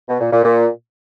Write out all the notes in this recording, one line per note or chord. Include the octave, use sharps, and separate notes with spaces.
B2
A#2
A#2
A#2